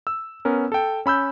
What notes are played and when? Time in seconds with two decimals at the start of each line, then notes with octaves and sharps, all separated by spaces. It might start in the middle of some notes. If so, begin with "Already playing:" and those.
0.07 E6
0.45 B3 C#4 A#4
0.72 A4 G5
1.06 C#4 B5 E6 G6